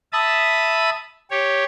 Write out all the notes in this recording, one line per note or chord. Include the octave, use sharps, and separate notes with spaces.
E5 A5 B5 D#6
G4 C#5